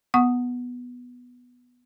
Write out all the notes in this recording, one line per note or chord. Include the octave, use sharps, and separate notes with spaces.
B3 F#5 C#6 D#6